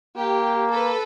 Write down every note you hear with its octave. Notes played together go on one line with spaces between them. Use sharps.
A#3 G4
A4 B4